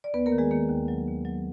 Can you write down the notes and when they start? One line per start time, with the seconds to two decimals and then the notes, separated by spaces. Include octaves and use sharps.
0.04 D5
0.14 D#2 B3 B4
0.26 A#3 A#4
0.32 D#3
0.38 G#3 G#4
0.51 D#3 A#3
0.69 D#2
0.88 F#3
1.07 D#2
1.25 F#3